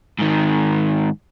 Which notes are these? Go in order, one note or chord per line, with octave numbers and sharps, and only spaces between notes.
G#2 D#3